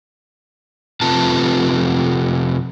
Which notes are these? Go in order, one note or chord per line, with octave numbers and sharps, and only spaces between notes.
F2 C3 A3 F4 B4 A5